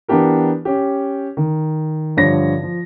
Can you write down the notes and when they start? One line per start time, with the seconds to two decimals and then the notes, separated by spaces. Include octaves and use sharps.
0.08 E3 B3 D4 G4 A#4
0.65 C#4 G4
1.37 D#3
2.17 G2 D3 F3 C#5 A#6
2.63 F3